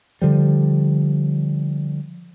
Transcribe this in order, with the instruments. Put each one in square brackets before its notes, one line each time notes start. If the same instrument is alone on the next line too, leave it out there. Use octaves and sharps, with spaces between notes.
[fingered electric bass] D3 F3 G3